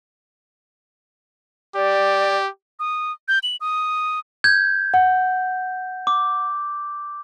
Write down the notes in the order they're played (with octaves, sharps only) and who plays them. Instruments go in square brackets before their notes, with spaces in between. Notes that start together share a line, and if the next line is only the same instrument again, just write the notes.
[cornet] G4 [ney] D5
[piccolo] D#6
G6
F#7
D#6
[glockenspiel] G6 [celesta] G#6
[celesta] F#5
[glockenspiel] D6